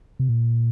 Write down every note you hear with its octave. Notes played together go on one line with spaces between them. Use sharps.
C3
A#2